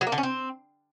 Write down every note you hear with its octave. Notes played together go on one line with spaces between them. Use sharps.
F#3
A#3
D3
C#4
C4